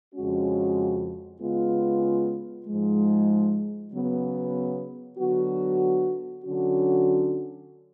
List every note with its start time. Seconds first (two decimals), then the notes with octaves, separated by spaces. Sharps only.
0.15 F2 C#3 G#3 C#4 F#4
1.40 C#3 G#3 B3 F4
2.67 G#2 F3 G#3
3.93 C#3 F#3 B3
5.18 D3 F#3 B3 F#4
6.44 D3 F#3 C#4 F#4